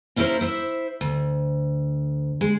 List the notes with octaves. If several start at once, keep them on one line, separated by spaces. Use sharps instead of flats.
A#3 C#4 E4 G4 A#4 C5
E4 C5 E5
D2
G#3